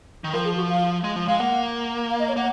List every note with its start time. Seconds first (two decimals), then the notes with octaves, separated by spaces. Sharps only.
0.24 D#3
0.33 F3 A#4
0.45 G#4
0.56 F#4
0.69 F5
1.04 G#3
1.16 F3
1.28 G#3 F5
1.39 A#3 F#5
2.10 F5
2.19 D#5
2.28 C#5
2.37 A#3 F#5